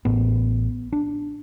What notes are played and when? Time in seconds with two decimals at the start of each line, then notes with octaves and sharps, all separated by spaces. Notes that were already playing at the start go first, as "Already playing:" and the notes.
0.05 A1 A2 B3
0.93 D4